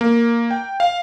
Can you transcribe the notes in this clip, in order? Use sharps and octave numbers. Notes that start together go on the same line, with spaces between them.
A#3
G5
F5